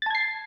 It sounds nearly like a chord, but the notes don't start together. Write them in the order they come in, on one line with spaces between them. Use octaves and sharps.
A6 A5 G#6 C7